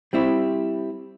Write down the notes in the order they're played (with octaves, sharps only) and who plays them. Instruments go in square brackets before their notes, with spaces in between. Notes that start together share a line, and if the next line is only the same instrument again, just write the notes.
[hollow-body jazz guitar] G3 C4 E4